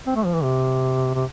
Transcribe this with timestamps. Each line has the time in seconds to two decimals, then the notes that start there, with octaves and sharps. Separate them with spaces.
0.07 C4
0.16 A3
0.25 F3
0.34 E3
0.43 C3
1.15 C3